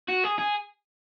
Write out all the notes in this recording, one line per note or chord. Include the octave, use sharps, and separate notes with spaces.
F#4
G#4
G#4